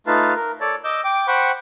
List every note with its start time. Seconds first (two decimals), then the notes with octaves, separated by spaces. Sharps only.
0.07 A3 D#4 F4 B4 F5 A5
0.36 A#4
0.61 A4 C#5 D5 A5
0.84 D#5 D6 E6 G6
1.04 G5 D6
1.27 C5 F#5 G5 B5 C#6